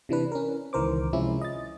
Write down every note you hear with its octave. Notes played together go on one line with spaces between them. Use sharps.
C3 E3 D4 B4
C#4 A#4
C#2 D#3 E3 A#4 C5 D6
C3 F3 G#3 C#4 E4
D#5 A6